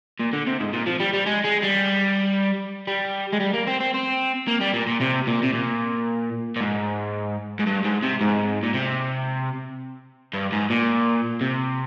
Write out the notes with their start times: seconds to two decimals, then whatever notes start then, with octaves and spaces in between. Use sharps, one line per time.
0.19 A#2
0.33 D3
0.47 C3
0.60 G#2
0.73 A#2
0.86 F3
1.00 G3
1.13 G3
1.26 G#3
1.44 G#3
1.62 G3
2.87 G3
3.32 G#3
3.40 G3
3.53 A#3
3.67 C4
3.80 C4
3.94 C4
4.47 A#3
4.61 G3
4.74 A#2
4.87 A#2
5.01 C3
5.27 A#2
5.43 C3
5.53 A#2
6.56 A#2
6.61 G#2
7.60 G#2
7.67 G2
7.85 G#2
8.03 C3
8.21 G#2
8.63 A#2
8.74 C3
10.33 G2
10.52 G#2
10.70 A#2
11.41 C3